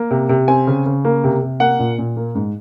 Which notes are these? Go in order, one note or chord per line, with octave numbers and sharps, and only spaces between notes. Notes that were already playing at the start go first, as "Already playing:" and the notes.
Already playing: A#3
C3
C3
C4 G#5
C#3
C#3
A#3
C3
C3
A#3 F#5
A#2
A#2
A#3
G#2